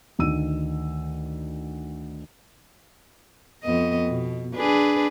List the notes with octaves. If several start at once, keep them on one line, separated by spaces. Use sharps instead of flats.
D2 D#3 D#4 E6 D#7
F2 B3 D#5
B2
D4 G#4 B4